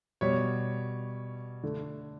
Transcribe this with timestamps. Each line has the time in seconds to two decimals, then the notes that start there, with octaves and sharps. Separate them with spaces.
0.21 B2 G3 C#5
1.63 D3 A3